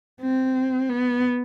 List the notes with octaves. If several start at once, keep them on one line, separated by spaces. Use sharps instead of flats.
C4
B3